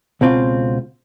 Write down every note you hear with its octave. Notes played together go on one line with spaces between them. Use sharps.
C#2 B2 C4 F4